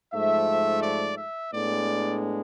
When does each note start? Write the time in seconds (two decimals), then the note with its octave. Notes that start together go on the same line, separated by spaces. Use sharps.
0.14 G#2 F3 A3 E5
0.83 D5
1.17 E5
1.52 A2 G#3 B3 D4 D5